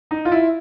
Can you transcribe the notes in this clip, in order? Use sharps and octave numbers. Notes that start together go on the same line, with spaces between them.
D#4
F4
E4